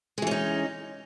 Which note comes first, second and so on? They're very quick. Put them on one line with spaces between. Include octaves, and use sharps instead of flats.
G#3 E3 C#4 D#4